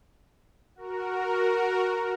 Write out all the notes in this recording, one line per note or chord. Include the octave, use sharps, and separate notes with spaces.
F#4 A#4